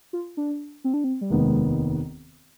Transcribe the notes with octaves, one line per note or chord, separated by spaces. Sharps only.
F4
D4
C4
D4
C4
G3
F1 D#2 D#3 G#3 B3